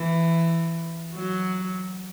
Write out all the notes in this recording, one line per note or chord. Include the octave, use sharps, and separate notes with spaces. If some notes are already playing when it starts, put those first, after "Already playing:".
Already playing: E3
F#3